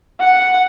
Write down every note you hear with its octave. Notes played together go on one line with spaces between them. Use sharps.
F#5